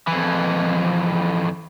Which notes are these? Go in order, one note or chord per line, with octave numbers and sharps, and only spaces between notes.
F2 E3